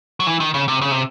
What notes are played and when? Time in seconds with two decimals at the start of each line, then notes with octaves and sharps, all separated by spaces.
0.20 F#3
0.27 E3
0.40 D#3
0.54 C#3
0.68 C3
0.81 C#3
0.91 C3